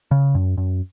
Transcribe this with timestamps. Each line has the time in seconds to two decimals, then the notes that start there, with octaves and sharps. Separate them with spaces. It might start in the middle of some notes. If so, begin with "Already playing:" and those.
0.11 C#3
0.35 F#2
0.58 F#2